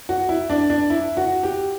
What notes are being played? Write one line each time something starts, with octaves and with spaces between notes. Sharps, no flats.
F#4
E4
D4
D4
E4
F#4
G4